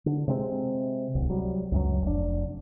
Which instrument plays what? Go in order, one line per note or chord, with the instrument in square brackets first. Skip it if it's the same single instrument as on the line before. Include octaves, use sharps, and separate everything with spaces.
[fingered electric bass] D3
C3 G#3 A3 C4
D1 C2
F#3 G3
C#2 F#2 F#3
F1 D4